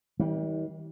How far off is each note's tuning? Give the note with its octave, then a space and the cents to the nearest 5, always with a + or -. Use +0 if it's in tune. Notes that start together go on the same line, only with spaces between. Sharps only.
D#3 +45 G3 -20